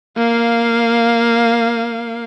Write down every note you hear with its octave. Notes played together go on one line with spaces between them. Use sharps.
A#3 F5